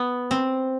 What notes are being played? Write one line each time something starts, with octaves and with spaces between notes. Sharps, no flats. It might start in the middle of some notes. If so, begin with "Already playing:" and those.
Already playing: B3
C4